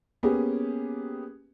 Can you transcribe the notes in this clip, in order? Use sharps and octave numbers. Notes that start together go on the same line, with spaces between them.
A#3 B3 C#4 G4 G#4